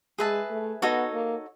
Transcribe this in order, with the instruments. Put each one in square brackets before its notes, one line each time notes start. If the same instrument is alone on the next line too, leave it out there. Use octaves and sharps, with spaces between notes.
[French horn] G#3 [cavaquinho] G#4 B4 E5 A5
[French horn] A3
[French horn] B3 [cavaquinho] D#4 F#4 A4 C#5
[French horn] A#3